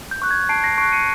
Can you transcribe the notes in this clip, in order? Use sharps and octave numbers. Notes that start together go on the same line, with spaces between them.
G6
C#6 F#6
G#6
A5 C7 D7
A#6 C7
C#6 F#6 C7 D7
C#7 D#7